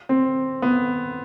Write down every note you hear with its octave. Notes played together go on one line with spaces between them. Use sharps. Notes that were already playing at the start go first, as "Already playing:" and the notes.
C4
B3